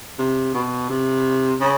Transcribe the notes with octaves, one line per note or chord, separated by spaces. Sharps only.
C3
B2
C3
C#3